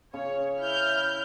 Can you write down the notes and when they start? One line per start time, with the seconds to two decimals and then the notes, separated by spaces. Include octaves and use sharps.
0.14 C#3 C#5
0.60 E4 F6 G6